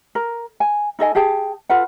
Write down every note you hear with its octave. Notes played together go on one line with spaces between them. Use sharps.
A#4
G#5
D#4 A4 D#5 G#5
G4 G#4 G5 A5
F4 A4 B4 F#5